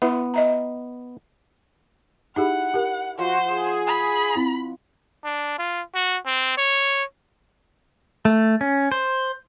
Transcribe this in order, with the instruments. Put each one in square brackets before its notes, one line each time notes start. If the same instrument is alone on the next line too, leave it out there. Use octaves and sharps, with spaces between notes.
[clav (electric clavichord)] B3 [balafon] E4 B4 E5
[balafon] D#5 E5 A#5
[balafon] D#4 G4 G#4 [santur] E4 [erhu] F#5
[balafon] G4 A#4
[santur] F3 D#5 F#5 [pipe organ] F#4 [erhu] C5
[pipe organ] G#4
[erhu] B5
[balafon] C4 E4
[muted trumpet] D4
F4
F#4
C4
C#5
[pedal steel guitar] A3
C#4
C5